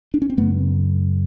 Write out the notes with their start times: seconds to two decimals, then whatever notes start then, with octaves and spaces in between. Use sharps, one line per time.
0.14 D4
0.22 C#4
0.30 C4
0.37 F#2 C#3 A3 B3